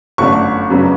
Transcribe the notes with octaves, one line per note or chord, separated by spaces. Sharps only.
G1 F#2 D3 A3 D4 C#6
F#2 C#3 F#3 B3 D4